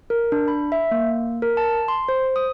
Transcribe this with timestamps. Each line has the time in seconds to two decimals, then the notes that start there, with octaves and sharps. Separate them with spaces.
0.10 A#4
0.32 D4
0.48 B5
0.72 E5
0.91 A#3
1.42 A#4
1.57 A5
1.88 C6
2.08 C5
2.36 D#6